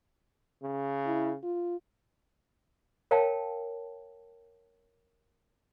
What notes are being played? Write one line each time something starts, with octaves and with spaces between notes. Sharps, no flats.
C#3
E4
F4
A#4 C#5 F5 G5 A5